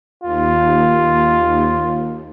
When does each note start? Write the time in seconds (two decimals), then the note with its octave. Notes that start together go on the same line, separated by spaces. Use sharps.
0.24 D#2 F4